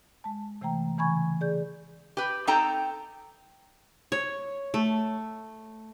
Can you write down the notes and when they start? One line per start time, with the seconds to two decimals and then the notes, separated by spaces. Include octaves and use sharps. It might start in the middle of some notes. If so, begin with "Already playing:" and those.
0.24 G#3 A5
0.61 C3 E3 A3 G5 A#5
0.98 C#3 E3 G#5 B5 C#6 G#6
1.41 G#4 D5 G6
2.17 G4 B4
2.47 C4 D#4 A4 G5 A#5
4.12 C#5
4.74 A3